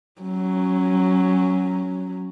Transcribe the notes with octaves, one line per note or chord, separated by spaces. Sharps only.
F#3 C#4